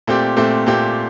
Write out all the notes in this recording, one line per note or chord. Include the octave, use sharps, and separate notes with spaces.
A#2 A3 C4 G4
A#2 A3 C4 G4
A#2 A3 C4 G4